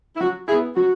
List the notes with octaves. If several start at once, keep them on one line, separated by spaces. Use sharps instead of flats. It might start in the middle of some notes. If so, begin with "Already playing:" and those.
E4
F#3 F#4
B3 E4 G#4
F#3 F#4